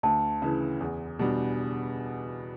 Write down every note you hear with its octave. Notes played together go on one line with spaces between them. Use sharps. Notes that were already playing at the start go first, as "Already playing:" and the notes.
D2 A5
C#3 E3
E2
B2 G3 D4